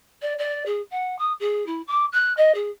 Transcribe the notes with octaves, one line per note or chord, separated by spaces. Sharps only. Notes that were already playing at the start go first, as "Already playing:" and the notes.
D5
D5
G#4
F#5
D#6
G#4
E4
D6
F#6
D#5
G#4